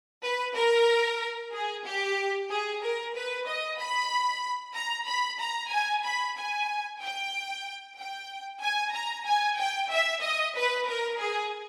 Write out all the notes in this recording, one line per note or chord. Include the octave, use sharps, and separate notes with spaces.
B4
A#4
G#4
G4
G#4
A#4
B4
D#5
B5
A#5
B5
A#5
G#5
B5
G#5
G5
G5
G#5
A#5
G#5
G5
E5
D#5
B4
A#4
G#4